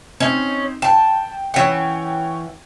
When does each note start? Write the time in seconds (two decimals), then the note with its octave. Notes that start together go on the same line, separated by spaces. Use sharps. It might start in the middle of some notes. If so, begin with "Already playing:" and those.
0.20 C4 C#4 D#4
0.82 G5 A5
1.54 E3 C#4 C#5 F#5 G5